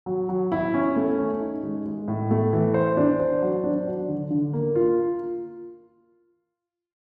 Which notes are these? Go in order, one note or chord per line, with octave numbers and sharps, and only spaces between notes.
F#3
F#3
E4
C#4
A3
C#4
D#4
G#3
G#3
A2
A3
E3
C5
D4
C5
F#3
D4
F#3
D3
D3
A#3
F4